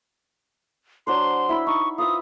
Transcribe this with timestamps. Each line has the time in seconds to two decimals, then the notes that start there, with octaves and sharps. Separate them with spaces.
1.07 F#3 D4 C5 C6
1.49 E4 B5 E6
1.67 D#4 C#6
1.98 F4 B4 E5 D#6